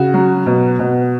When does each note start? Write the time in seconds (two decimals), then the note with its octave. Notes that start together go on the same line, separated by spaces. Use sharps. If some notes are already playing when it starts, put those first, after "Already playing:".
Already playing: C#3 F#4
0.14 F#3
0.46 B2
0.79 B2